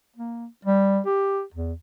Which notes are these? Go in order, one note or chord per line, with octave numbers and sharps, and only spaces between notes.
A#3
G3
G4
E2